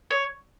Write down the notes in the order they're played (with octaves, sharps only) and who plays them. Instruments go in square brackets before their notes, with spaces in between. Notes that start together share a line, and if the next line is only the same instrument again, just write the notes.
[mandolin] C#5